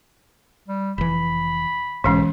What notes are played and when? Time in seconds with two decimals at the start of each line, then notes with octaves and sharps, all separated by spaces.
0.68 G3
0.98 F1 E3 B5
2.04 B1 G#2 E3 G#3 C#4